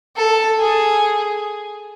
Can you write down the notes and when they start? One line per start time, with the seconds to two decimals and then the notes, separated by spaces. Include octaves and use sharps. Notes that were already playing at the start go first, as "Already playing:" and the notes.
0.16 A4
0.59 G#4